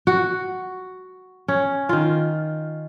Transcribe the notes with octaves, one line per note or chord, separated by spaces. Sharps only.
F#4
C#4
D#3 F4